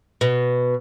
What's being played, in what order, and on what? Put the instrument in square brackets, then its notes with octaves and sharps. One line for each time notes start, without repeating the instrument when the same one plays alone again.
[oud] B2